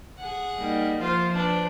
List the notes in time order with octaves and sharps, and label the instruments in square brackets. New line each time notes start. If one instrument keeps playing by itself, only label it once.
[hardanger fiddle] G#4 F#5
[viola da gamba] G3 A#3 D#4
[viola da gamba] F3 C5 [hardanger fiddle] F4 F5
[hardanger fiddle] D4 B4